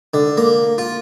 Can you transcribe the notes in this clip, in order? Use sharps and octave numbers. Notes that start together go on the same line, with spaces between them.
D3
A#3
F4